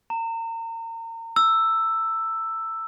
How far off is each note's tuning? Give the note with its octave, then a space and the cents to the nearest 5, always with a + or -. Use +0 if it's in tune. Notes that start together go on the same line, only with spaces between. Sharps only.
A#5 -35
E6 +5